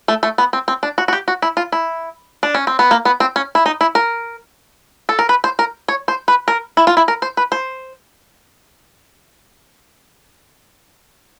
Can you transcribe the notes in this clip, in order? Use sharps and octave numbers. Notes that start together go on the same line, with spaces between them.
A3
A3
B3
C4
C4
D4
F#4
F#4
G4
F#4
E4
F4
E4
D4
C#4
C4
B3
A#3
B3
C4
C#4
E4
D#4
E4
A#4
A4
A#4
B4
C5
A#4
C#5
C5
B4
A#4
E4
F4
E4
A#4
C5
B4
C5